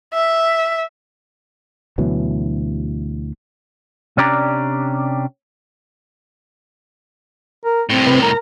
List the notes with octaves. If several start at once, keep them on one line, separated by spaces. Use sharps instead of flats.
E5
D2 B2 E3 F#3
C3 C#4 D4 G4 D5 A#5
A#4
C2 A2 C4
C3 B4
A#4 A#5